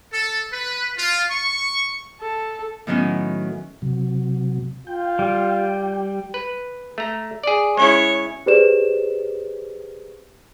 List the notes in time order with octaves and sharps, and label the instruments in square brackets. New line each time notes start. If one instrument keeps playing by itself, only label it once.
[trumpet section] A4
B4
F4
C#6
[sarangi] A4
[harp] A2 D#3 F#3 B3 C#4
[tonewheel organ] C3 F#3
[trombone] F4 [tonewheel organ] G5
[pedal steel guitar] G3
[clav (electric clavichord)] B4
A3 A#5
G#4 D5
[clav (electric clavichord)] G#3 C#4 E4 [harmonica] C#5
[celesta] G4 G#4 B4 C5 D5 E7